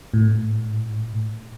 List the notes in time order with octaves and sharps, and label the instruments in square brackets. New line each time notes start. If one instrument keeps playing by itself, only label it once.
[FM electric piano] A2